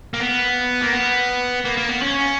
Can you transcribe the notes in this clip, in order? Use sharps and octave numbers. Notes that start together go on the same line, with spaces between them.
A#3
B3
A#3
B3
A#3
A#3
B3
C#4